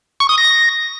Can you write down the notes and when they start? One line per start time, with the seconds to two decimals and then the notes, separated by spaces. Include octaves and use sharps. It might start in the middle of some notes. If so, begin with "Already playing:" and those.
0.20 C#6
0.29 D#6
0.38 A#6